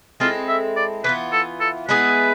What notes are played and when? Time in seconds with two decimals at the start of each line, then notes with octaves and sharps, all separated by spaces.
0.20 G#3 C4 E4 F4 A4
0.49 E5
0.76 D5
1.04 E3 B3 F4 B4
1.33 A4
1.61 A4
1.88 G#3 B3 E4 G#4 B4